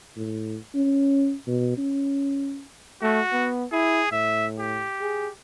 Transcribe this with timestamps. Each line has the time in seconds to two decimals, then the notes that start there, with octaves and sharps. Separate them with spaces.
0.17 A2
0.75 C#4
1.47 B2
1.78 C#4
3.02 A3 F#4
3.32 B3
3.72 E4 G#4
4.12 A2 E5
4.60 G4
5.01 G#4